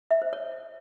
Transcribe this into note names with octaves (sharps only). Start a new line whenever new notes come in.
E5
C5
C#5